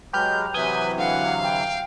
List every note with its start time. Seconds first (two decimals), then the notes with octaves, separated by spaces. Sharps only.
0.13 F#3 G#3 G4 B4 F6 G6
0.54 C3 E3 F#3 B4 G#5 D#6 G6 G#6
0.98 D3 F5 F#5
1.43 G5